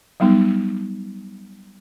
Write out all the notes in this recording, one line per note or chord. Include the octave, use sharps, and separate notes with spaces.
F#3 G3 B3 D#4